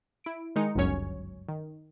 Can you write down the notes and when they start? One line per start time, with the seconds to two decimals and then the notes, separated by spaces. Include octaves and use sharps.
0.24 E4 D7
0.56 D#3 G#3 D#4 C#7
0.75 G1 C#2 F#2 F#3 C#4 C#5
1.49 D#3